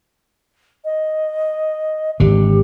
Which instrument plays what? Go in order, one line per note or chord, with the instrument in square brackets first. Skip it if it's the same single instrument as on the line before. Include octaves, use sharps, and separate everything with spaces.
[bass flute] D#5
[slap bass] G#1 D3 [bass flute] G4